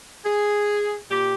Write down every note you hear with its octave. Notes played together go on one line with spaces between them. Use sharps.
G#4
A#2 G4